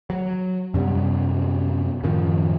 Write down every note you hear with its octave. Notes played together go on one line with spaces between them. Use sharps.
F#3
F#2 C3 G3 B3
F#2 A2 D#3 F3